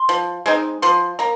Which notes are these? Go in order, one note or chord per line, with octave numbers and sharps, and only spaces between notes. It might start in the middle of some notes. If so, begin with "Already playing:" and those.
Already playing: C6
F3
G#3 C4 D#4
F3 C6
A#3 A#5